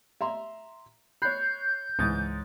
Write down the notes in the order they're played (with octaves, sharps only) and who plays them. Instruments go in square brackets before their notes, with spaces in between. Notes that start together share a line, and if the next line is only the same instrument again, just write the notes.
[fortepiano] E5 A#5 C6
[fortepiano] C#5 B5 [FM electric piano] F#6 C7 [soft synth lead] G6
[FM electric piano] C#2 D#6 A6 [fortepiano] G#2 E3